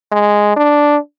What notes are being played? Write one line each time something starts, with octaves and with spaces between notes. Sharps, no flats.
G#3
D4